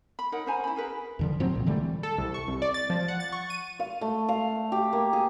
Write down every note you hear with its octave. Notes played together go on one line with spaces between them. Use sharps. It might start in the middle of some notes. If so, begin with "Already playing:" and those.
B5
D#4 A#4 C#5 F#5
C#4 C5 G#5 A#5
E4 B5
G#4 A#4 B4
E2 D3 F3
G#2 F3 F#3 C4
C2 A#2
D3 E3 G3 A3
A4
C2
C#6
C2
D5
A6
F3
F#5
A6
C#6
D#7
F5
A3
F5
G4
A#3
G#4